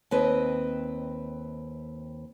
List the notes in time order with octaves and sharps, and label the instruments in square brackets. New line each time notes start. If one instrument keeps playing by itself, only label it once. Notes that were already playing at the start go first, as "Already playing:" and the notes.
[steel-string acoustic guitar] D#2 C4 B4 D#5